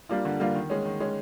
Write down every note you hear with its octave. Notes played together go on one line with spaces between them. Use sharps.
G3 A#3 D4 F4
D3
G3 A#3 D4 F4
D#3
G#3 C#4
D#3
G#3 C#4